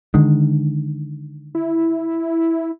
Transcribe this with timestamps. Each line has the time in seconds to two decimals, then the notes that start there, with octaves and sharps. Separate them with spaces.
0.14 D3 D#3 G#3
1.55 E4